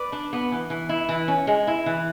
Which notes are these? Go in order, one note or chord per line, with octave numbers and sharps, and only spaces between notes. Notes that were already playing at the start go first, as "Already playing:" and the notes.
Already playing: B4 D5
D4
B3
E3
E3
E4
E3
C#4
G#3
E4
E3